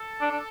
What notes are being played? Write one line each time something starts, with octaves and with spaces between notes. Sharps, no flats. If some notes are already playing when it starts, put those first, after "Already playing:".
Already playing: A4
D4
D4